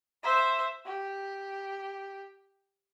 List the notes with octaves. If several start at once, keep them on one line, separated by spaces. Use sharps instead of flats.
C5 E5
G4